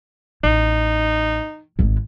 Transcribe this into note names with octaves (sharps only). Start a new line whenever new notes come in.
A1 D#4
G#1 G#3